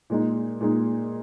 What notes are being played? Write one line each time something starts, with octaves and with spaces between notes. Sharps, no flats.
A#2 G#3 D#4
A#2 G#3 D#4